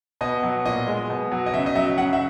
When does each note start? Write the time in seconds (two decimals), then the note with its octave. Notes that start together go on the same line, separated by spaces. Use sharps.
0.21 B2 D#5
0.43 F#3
0.66 A#2 D#5
0.88 G#3
1.10 B2
1.32 F#3
1.46 D#5
1.53 C#3 E5
1.66 D#5
1.75 F#3 E5
1.97 C#3 F#5
2.13 E5